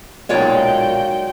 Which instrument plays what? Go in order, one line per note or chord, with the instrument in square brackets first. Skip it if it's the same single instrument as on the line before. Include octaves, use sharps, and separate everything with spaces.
[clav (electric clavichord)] B1 A#2 [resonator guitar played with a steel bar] G#3 C#5 D5 [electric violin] F#4 G5